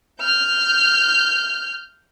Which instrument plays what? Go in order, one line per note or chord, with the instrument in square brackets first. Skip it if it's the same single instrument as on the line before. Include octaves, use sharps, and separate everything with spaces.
[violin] F6 G6